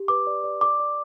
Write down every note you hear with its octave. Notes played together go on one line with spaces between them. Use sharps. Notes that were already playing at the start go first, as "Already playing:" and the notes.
Already playing: G4
B4 D6
D5
D5
D5 D6
D5